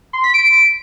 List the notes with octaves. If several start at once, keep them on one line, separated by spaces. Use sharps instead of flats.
C6
B6
D7